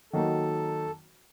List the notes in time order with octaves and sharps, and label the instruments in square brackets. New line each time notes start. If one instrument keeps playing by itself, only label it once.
[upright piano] D#3 F#3 A#3 D#4 F#4 [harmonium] A4